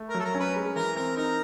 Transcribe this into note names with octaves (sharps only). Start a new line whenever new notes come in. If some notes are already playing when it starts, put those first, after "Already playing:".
Already playing: A3
F#3 A#4
A4
A#4
C#4
B4
G#3
E3 A#4
C4 A#4
D#4 A#4